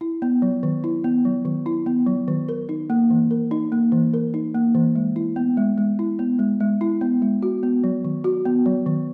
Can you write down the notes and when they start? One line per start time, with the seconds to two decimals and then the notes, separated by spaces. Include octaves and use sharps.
0.01 E4
0.22 B3
0.42 F#3
0.63 D#3
0.84 E4
1.04 B3
1.25 F#3
1.45 D#3
1.66 E4
1.86 B3
2.07 F#3
2.28 D#3
2.49 A#4
2.69 D#4
2.90 A#3
3.10 E3
3.31 A#4
3.51 D#4
3.72 A#3
3.92 E3
4.13 A#4
4.34 D#4
4.55 A#3
4.75 E3
4.96 G#3
5.16 E4
5.36 B3
5.57 G#3
5.78 G#3
5.99 E4
6.19 B3
6.39 G#3
6.60 G#3
6.81 E4
7.01 B3
7.22 G#3
7.43 F#4
7.63 B3
7.84 F#3
8.05 D#3
8.24 F#4
8.45 B3
8.66 F#3
8.86 D#3